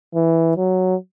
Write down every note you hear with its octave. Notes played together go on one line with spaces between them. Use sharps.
E3
F#3